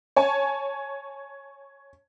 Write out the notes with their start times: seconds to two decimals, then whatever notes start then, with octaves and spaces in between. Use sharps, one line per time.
0.16 C#5 G#5 A5